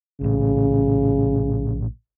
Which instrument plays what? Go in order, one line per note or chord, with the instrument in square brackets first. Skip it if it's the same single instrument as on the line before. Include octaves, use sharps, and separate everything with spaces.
[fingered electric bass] A#1 A2 [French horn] C#3